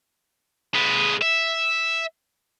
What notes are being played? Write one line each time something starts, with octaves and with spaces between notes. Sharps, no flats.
G#3 B4
E5